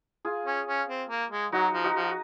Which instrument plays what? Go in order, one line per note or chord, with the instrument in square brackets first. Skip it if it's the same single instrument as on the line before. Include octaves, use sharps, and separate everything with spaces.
[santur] F4 G#4
[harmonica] C#4
C#4
C4
A#3
G#3
[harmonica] F#3 [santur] D#4 F#4
[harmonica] F3
[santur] D#4 F#4
[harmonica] F3